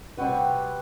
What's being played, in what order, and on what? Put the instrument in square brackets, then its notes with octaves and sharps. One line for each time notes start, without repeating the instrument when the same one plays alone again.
[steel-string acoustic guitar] C3 G3 C4 F#4 B4